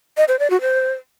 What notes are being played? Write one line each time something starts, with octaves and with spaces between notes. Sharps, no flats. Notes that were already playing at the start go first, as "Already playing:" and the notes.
D#5
C5
D5
F#4
C5